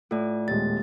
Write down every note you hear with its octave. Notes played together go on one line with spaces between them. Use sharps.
A2 F4 D5
D#1 G#3 B3 A6